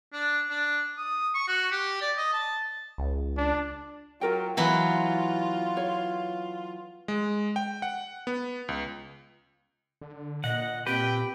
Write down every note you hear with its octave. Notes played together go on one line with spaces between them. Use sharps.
D4
D4
D#6
C#6
F#4
G4
D5
D#5
A5
C#2
D4
F#3 F4 A#4 G5
E3 F#3 B3 E4 F4 B5
C#5
G#3
G5
F#5
B3
C#2
D3
A#2 D#5 F#5
C4 G4 B4 G5